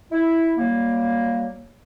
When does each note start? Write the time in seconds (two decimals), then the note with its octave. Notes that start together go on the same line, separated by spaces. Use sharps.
0.12 E4
0.58 F#3 G3 A#3